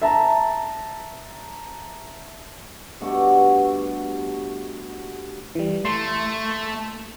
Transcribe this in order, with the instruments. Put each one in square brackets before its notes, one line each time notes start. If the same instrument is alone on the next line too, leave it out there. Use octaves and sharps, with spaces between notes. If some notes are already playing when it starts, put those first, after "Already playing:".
[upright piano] E5 A5 A#5
[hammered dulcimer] G2 B2 A3 F#4
[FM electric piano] E3 G3
[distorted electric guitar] A3 [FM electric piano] C6